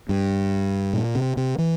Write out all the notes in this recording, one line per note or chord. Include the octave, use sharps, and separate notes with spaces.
G2
A#2
C3
C3
E3